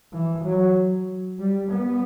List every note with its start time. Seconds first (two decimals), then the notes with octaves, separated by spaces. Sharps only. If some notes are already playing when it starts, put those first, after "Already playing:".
0.13 E3
0.45 F#3
1.40 G3
1.72 B3